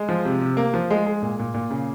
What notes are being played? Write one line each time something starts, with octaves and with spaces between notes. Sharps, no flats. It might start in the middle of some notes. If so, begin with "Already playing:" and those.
Already playing: G#3
F3
C3
C3
A#3
F3
G#3
G#3
A#2
A#2
A#2
C#3